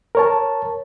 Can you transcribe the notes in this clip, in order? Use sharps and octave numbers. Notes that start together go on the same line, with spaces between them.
A#4 C#5 A5